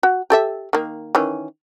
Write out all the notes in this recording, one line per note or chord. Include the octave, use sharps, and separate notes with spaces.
F#4
G4 A4 E5
D#3 A#3
D#3 E3 C#4